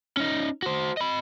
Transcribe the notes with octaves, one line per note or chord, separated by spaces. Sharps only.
C#4 D#4
F#4 C5
D#5 B5